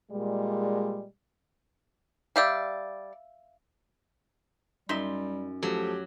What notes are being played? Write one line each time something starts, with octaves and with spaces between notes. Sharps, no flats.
A#2 G3 G#3
G3 G4 D5 E5 F5 E6
F#2 G3 D#4 E5 C6
F3 F#3 A3 G4 A4